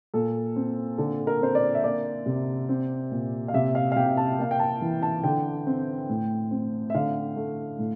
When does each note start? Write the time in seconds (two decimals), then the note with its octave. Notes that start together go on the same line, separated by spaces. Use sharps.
0.14 A#2 A4
0.56 C4
0.98 D3 A4
1.27 A#4
1.41 C4 C5
1.55 D5
1.75 E5
1.83 A#3 D5
2.26 C3
2.69 C4
3.11 A#2
3.48 F5
3.54 C3 E5
3.75 F5
3.92 F5
3.96 C3 G5
4.17 A5
4.39 A#3 F5
4.51 G5
4.59 A5
4.81 E3
5.02 A5
5.24 D3 G5
5.67 C4
6.09 A2
6.51 C4
6.90 E5
6.94 D3 F5
7.36 A3
7.79 A2